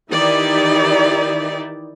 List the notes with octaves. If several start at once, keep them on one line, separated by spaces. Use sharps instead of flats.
D#3 E3 D#4 E4 G4 D5